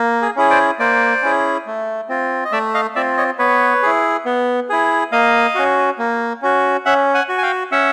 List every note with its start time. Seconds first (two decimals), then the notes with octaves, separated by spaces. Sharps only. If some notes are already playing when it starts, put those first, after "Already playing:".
Already playing: A#3
0.22 G#4
0.36 C#4 E4 G#4
0.50 C5 D5
0.79 A#3 C5 D5
1.22 C#4 E4 G#4
1.67 A3
2.09 C4 F4
2.45 D#5
2.52 A3 D5 E5
2.74 D#5 F5
2.95 C4 F4 D5 E5
3.17 C#5 D#5
3.39 B3 B4 C#5
3.82 E4 G#4
4.25 B3
4.69 E4 G#4
5.12 A#3 D#5 F5
5.55 C#4 F#4
5.98 A#3
6.42 C#4 F#4
6.86 C#4 E5 F#5
7.14 F#5 G#5
7.29 F#4
7.38 G#5
7.43 F5 G5
7.72 C#4 E5 F#5